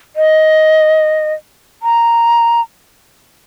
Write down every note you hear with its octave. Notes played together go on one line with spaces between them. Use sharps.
D#5
A#5